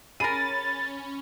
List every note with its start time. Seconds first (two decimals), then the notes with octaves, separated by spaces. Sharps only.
0.20 C#4 G#4 A#4 B5 A6 D#7